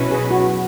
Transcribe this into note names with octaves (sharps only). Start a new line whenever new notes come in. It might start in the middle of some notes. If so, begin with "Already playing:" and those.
Already playing: B2 F#3 C#4 E4 B4
G#4
F#4